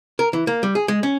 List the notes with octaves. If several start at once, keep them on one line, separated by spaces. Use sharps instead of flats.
A#4
E3
A#3
G3
G#4
G#3
C#4